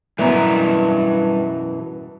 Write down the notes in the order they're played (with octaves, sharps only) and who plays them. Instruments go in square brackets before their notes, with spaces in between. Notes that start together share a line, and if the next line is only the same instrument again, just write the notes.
[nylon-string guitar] F#2 B2 E3 [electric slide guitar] G3 B4 A#5